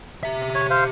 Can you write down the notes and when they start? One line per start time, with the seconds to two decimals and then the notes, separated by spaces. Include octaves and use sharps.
0.23 G4 E5
0.54 C#5
0.70 C5 F5